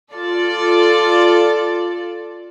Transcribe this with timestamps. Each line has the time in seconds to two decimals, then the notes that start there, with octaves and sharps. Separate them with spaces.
0.14 F4 A4 D5